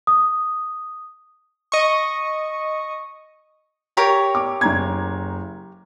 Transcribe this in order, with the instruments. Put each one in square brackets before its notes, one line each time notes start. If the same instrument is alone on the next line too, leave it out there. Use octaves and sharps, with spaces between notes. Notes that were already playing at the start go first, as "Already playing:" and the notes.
[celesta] D#6
[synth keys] D#5 C#6
[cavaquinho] G4 A#4 C#5
[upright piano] D6
F#1 A#5 G#6